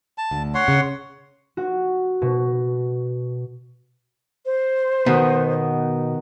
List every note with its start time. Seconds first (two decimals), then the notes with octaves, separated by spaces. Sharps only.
0.18 A5
0.31 D2
0.54 C#5 F#5 C6
0.68 C#3
1.57 F#4
2.22 B2
4.46 C5
5.06 B2 D#3 B3 D#4